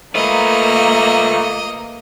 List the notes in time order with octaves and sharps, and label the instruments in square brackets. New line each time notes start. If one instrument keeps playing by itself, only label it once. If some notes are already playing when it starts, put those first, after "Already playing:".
[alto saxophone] A3 [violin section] A#3 [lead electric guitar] F4 B4 [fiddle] D#5